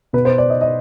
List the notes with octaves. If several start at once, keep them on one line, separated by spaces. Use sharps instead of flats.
B2 B4
C5
D5
D#5
D#5